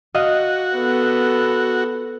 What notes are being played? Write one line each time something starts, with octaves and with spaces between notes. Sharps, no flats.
F#4 D#5 F5
B3 A4